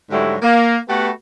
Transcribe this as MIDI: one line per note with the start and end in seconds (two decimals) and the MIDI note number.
0.11 0.35 44
0.11 0.35 50
0.11 0.35 54
0.11 0.35 55
0.11 0.35 57
0.11 0.35 64
0.42 0.78 58
0.88 1.09 57
0.88 1.09 59
0.88 1.09 66
0.88 1.09 67
0.88 1.09 71
0.88 1.09 78